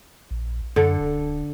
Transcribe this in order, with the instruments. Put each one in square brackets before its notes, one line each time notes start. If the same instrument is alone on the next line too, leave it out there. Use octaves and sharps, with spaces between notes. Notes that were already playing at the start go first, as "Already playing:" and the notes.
[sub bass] A#1
[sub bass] F#2 [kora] D3 A4
[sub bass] D1
D1